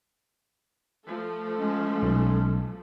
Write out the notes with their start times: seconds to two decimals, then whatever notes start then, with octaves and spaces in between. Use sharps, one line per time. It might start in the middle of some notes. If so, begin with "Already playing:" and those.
1.05 F3 A3 A4
1.59 G#3 C#4
2.02 B1